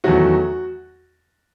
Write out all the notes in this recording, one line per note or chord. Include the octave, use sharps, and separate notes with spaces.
E2 D#3 F#3 A3 F#4